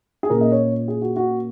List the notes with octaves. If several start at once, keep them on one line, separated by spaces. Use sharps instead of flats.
G#4
A#2 A#3 C#4 A#4
D#5
C#5
G#4
F#4
F#4